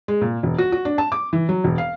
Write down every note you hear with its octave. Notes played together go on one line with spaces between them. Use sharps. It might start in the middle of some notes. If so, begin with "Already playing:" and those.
G#3
A#2
E1
F#4
F#4
D4
A5
D6
E3
F#3
E1
F5